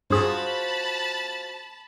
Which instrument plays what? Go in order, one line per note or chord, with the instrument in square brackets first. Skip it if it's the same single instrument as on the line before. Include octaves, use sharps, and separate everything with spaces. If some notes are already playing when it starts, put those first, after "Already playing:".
[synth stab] G2 G#4 [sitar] F4 F#4 C5 [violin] A5 B5